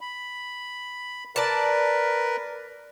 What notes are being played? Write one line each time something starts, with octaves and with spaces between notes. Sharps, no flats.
B5
A#4 B4 D5 A5